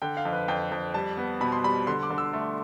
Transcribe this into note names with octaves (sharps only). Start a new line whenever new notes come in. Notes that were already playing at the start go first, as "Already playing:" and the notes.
D3 G5
F5
F2
B4
F2 G5
F2
G3 A5
B3
B2 B5
C6
G3 B5
D3 C6
D6
D3
E6
A3